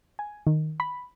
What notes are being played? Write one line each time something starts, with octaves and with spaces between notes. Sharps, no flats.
G#5
D#3
B5